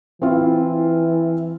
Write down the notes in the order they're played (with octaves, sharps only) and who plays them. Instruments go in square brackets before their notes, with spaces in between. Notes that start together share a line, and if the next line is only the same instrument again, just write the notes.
[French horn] E3 [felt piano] C4 E4 F4